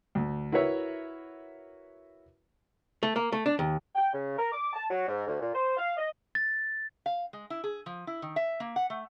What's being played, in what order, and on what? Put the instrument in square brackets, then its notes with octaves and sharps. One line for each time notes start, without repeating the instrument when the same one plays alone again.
[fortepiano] D2
E4 F#4 A#4 B4 C#5 E5
[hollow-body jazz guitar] A3
A#3
A3
D4
D#2
[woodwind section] G5
C#3
A#4
D6
A5
F#3
G#2
D2
A#2
C5
F5
D#5
[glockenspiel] A6
[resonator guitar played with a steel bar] F5
G#3
E4
G#4
F3
E4
D#3
E5
A#3
F#5
A3